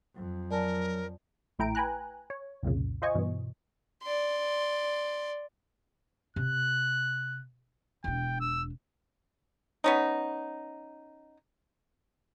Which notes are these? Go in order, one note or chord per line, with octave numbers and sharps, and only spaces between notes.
F2 F#3
F#3 A#4 D5 G#5 A5
A#1 A3 E4 G5 A#5 D7
B4 G5 G#5 A#5 F#6
C#5
C2 F2 A#2 C#3
F4 C5 D#5 G#5 C#6
G2 B2 E3
D5 C6
C3 F#6
E1 D4 G5
E6
B3 C#4 D#4